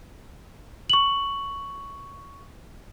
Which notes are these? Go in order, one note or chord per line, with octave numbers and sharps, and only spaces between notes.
C#6 F#7